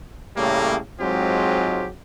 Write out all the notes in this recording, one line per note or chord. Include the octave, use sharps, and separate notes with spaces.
A2 C#3 G3 A3 A#3
G#2 F#3 G#3 C4 F4 G4